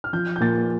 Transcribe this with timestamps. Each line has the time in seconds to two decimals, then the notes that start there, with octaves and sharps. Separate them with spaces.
0.04 F6
0.13 F3 G6
0.36 G6
0.41 A#2 A6